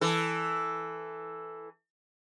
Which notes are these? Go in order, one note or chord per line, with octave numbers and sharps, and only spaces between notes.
E3 A4